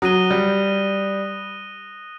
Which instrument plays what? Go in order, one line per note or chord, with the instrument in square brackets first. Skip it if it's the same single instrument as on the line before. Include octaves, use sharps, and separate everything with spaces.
[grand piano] F#3 [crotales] D#6 F#6 A#6 D#7 G7
[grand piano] G3